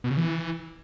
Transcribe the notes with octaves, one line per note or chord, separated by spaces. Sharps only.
B2
C#3
E3